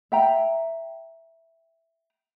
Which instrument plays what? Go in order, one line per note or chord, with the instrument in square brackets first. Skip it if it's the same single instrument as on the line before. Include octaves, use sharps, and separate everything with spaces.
[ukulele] E5 G5 A#5